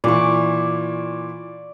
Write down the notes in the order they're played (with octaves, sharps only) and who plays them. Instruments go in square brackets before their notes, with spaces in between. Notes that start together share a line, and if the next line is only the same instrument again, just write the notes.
[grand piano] A#2 E3 [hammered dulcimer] D5 C#6